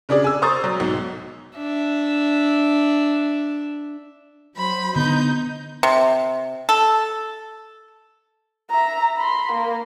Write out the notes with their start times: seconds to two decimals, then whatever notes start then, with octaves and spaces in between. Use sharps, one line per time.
0.09 C#3 D4 G#4 D5
0.24 G#5 E6
0.42 C5 A#5 C#6 D#6 A6
0.64 F#3
0.80 B1 G#2
1.56 D4 E5
4.56 F#3 C5 B5
4.96 D3 B3 D#4 G6
5.83 C3
6.69 A4
8.71 E5 A#5
9.17 B5 C6
9.52 A#3 A#4